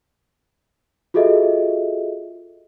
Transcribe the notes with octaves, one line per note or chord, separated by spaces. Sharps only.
F4 F#4 G#4 A4 D#5 E5